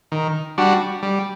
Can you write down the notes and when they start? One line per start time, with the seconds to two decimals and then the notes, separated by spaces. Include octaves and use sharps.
0.12 D#3
0.58 G3 D4 F#4
1.03 G3